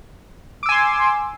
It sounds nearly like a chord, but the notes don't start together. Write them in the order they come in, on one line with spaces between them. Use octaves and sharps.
D6 E6 G#5 C6